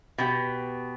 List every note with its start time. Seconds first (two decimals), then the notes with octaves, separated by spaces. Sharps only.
0.18 B2 B3 G4